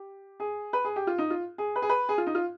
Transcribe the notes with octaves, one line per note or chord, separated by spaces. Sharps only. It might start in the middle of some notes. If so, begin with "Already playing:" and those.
Already playing: G4
G#4
B4
G#4
G4
F4
D#4
F4
G#4
B4
G#4
B4
G#4
F4
D#4
F4